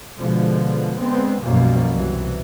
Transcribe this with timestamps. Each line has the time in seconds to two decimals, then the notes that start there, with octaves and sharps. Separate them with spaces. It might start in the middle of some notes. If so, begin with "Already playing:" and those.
0.19 B2 D3 F3 G#3
1.00 D3 G#3 B3 C4
1.44 B1 F#2 B2 F3 G3 A#3
1.93 C2 E3 F#3